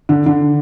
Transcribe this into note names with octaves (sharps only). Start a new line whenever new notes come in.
D3
D3